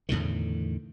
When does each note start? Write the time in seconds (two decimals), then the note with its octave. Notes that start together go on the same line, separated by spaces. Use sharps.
0.09 E2 A2 D3 D#3